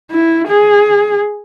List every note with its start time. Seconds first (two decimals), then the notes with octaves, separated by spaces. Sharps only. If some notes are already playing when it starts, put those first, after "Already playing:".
0.11 E4
0.48 G#4